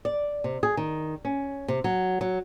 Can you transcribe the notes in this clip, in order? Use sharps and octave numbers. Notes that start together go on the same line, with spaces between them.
D5
C3
G#4
D#3
C#4
C3
F#3
F#3